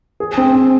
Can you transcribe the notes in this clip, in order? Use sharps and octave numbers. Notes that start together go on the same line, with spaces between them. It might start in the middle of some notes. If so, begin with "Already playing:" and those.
G#4
C4
C4